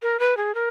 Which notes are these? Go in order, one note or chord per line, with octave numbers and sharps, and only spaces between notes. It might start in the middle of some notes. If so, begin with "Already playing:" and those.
A#4
B4
G#4
A#4